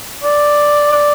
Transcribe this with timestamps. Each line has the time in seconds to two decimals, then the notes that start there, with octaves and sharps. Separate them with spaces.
0.24 D5
0.93 D5